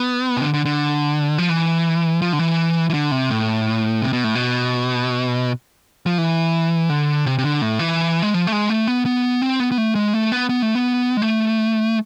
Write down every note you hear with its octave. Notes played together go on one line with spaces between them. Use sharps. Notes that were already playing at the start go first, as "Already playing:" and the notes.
Already playing: B3
C3
D3
D3
D3
F3
E3
F3
D3
E3
E3
D3
C3
A2
C3
B2
A2
B2
F3
E3
D3
C3
C3
D3
A2
E3
G#3
F3
A3
G#3
A3
B3
B3
C4
B3
B3
A3
G#3
A3
B3
B3
A3
B3
G#3
A3